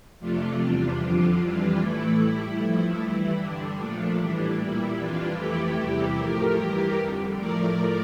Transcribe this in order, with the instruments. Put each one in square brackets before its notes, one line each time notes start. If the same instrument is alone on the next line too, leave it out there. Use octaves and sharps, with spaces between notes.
[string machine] F2 C3 F3 A3 D4 F4
E2 C3 G3
F2 D3 F3 D4 F4
F2 E3 G3
A2 E3 A3 E4
A2 G3
G2 F3 A3 E4
G2 E3 G3 E4
G2 D3 G3 D4
A#2 F3 A3
A2 E3 G3 D4
A#2 G3 E4
F2 E3 G3 D4 F4
F2 E3 A3 E4 G4
E2 C3 G3
A2 F3 A3 G4 A#4
G2 E3 G3
F2 D3 G3
A2 F3 A3 A#4 D5